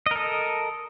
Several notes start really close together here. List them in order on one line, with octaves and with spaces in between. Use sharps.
D#5 A#4 A4